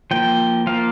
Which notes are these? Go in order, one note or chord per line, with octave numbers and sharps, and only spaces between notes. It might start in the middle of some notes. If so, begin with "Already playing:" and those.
F3 A#3 G5
F3 A#3 F5